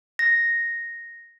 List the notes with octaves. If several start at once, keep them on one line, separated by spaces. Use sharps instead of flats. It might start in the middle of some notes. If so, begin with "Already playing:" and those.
A#6